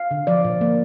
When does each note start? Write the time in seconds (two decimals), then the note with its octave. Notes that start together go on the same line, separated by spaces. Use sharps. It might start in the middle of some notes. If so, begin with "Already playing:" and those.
Already playing: F5
0.11 D3
0.27 F3 D5
0.45 A#2
0.61 A#3